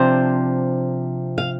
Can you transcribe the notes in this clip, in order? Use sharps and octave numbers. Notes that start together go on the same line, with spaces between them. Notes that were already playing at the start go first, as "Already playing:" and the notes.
Already playing: C3 F3 D4 C5
F5